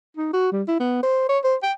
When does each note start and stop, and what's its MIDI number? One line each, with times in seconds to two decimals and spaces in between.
0.17 0.29 63
0.33 0.51 66
0.52 0.63 55
0.68 0.79 64
0.80 1.01 59
1.03 1.28 72
1.29 1.39 73
1.44 1.56 72
1.63 1.72 79